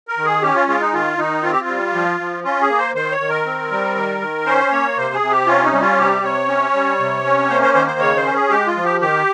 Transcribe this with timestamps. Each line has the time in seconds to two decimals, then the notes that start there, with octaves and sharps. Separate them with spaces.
0.08 A#4
0.17 D#3
0.25 G#4
0.42 C#4 G4
0.56 F4
0.68 G#3 F4
0.81 D#4
0.93 D#3 F4
1.18 D#3 D#4
1.43 C4 F4
1.52 G4
1.61 F4
1.68 G3
1.94 F3
2.20 F3
2.44 C#4 F4
2.62 G#4
2.69 A#3
2.78 C5
2.95 D#3 C5
3.12 C#5
3.20 D#3
3.29 A#4
3.46 C4
3.71 G3
3.96 D#3
4.21 D#3
4.46 C#4 C5
4.71 A#3 C#5
4.97 C3 C5
5.14 G#4
5.22 C3
5.31 G4
5.47 C#4 F4
5.64 D#4
5.73 G3
5.81 F4
5.98 C3 G4
6.23 C3 C#5
6.48 C#4
6.74 G3
7.00 C3
7.24 C#4
7.49 A#3 C5
7.63 C5
7.74 D#3 C5
7.87 C5
8.00 C#3 C#5
8.17 C5
8.26 C#4
8.34 G#4
8.50 G#3 G4
8.67 F4
8.76 F3
8.84 G4
9.01 D#3 G4